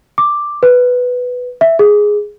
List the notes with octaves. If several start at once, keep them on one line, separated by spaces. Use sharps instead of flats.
D6
B4
E5
G#4